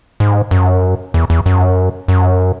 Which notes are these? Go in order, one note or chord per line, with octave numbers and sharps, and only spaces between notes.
G#2
F#2
E2
E2
F#2
F#2